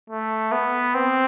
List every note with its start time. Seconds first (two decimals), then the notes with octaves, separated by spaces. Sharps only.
0.10 A3
0.52 B3
0.95 C4